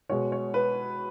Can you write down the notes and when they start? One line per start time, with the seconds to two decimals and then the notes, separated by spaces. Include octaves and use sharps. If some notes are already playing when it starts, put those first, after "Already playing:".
0.09 B2 G#3 C#5
0.32 C#5
0.54 B4